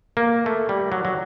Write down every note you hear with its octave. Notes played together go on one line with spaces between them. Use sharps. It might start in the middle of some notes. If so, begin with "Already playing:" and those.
A#3
A3
G3
F#3
F#3